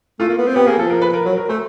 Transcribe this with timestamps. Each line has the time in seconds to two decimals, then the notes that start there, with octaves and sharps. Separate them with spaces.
0.20 A3 F4
0.29 A#3
0.38 B3
0.47 C4
0.55 B3 G4
0.67 A#3 G#4
0.79 F3 A4
0.90 A#4
1.02 B4
1.13 A#4
1.25 F#3 A#4
1.37 A#4
1.49 A3 C5